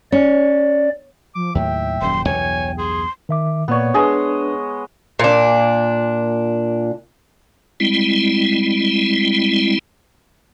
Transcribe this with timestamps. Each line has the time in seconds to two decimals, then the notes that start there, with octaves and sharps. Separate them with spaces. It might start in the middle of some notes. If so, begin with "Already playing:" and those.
0.12 C#4 D5
1.35 F3 D6
1.55 D#2 A2 F#3 E5 G5
2.01 D#1 F#2 F#3 C6
2.26 B1 E2 G2 C#5 G#5
2.78 G#4 C6
3.29 D#3 E5 D6
3.68 A#2 A#3 B3 C#5 D5
3.94 G#3 D4 G#4 B4 D#5
5.19 A#2 D4
7.80 G3 G#3 C4 E4